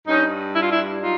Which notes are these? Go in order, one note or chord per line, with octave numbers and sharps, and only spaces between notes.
G2 C#4 D#4
G3 E4
F4
D4 E4
F#3 D#4 F4